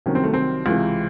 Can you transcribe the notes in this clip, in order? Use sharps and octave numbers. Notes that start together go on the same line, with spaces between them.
C2 C3 D#3 F#3 C#4
C4
A3
C4
C#2 C3 E3